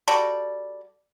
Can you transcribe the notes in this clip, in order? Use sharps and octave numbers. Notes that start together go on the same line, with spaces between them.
G3 F#4 A4 D5